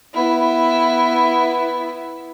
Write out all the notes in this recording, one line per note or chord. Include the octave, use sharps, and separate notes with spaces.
B3 E4